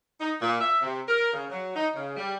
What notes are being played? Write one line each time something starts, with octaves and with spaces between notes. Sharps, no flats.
D#4
A#2
E5
C3
A#4
C#3
F#3
D#4
C#3
G3